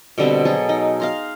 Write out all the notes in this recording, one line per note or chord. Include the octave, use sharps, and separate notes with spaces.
B2 D3 G3 C4
F#3 G#4 A4 C#6
D#4
F5 A#5 C6